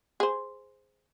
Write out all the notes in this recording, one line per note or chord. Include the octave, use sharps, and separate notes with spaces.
G#4 C5